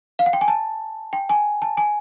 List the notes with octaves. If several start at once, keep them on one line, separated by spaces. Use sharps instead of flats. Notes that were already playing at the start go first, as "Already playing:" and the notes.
F5
F#5
G5
G#5
A5
G5
G#5
A5
G#5